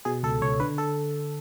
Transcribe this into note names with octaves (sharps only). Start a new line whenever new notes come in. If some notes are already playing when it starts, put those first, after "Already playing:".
B2 G#4
C#2 A4
C#2 C#5
D3 B4
A4